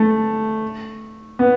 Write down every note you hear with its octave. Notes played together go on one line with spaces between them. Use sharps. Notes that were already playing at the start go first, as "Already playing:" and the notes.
Already playing: A3
B3